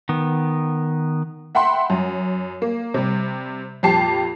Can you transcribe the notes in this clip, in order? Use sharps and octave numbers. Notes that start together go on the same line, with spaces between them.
D#3 B3
E5 F#5 G5 B5 C6
F#2
A#3
C3 G3
F2 A#2 G4 A5 C7